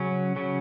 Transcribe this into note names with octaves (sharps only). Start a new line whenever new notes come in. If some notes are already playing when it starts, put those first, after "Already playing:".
Already playing: C#3 F#3 C#4
C#3 F#3 C#4